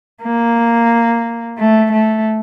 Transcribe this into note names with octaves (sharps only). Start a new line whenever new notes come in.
A#3
A3
A3